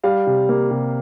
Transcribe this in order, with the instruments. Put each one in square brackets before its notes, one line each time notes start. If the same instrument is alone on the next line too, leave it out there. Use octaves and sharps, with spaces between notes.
[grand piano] G3 F5
C3
A#3
C3